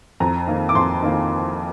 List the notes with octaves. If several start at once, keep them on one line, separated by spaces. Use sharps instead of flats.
F2 A#5
D#3 A#3
D6
F2 C6
D#3 A#3